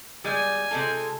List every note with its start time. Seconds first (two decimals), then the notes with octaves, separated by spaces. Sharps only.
0.24 G3 G#3 G#5
0.71 C3 G#3 F4 A4